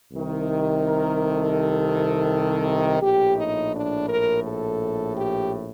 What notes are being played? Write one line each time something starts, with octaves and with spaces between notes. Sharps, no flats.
C2 C3 D#3
A#4
A4
A#1 A2 G4
D#4
D4
A#4
A4
G4